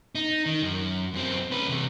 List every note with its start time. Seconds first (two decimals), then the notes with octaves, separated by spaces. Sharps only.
0.15 D#4
0.46 D#3
0.62 F#2
1.14 F#2 C4
1.51 C#4 B4
1.69 C3 E3